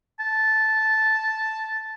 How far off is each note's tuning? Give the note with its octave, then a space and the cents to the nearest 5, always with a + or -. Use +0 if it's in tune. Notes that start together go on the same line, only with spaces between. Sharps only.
A5 -5